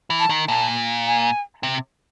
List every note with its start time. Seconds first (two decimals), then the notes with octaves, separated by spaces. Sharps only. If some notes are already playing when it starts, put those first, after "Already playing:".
0.10 E3
0.20 A5
0.30 D#3
0.48 A#2 A5
1.06 G#5
1.63 C3